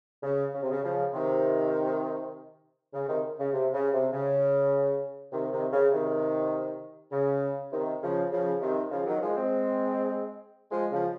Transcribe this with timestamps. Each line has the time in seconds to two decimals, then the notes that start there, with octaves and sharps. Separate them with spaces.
0.23 C#3
0.53 C#3
0.62 C3
0.70 C#3
0.83 C#3 F3
1.13 C3 D#3
2.93 C#3
3.07 C3 D#3
3.38 C#3
3.52 C3
3.73 C#3
3.93 C3
4.13 C#3
5.32 C3 D#3
5.52 C3 D#3
5.72 C#3
5.91 C3 D#3
7.11 C#3
7.71 C3 D#3
8.02 C#3 F3
8.31 C#3 F3
8.61 C3 D#3
8.91 C#3 F3
9.06 D#3 F#3
9.21 F3 G#3
9.36 G#3 C4
10.71 F3 G#3
10.91 C#3 F3